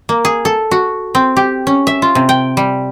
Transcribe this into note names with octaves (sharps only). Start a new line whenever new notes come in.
A#3
G#4
A4
F#4
C4
G4
C#4
E5
F4
C3
G5
G3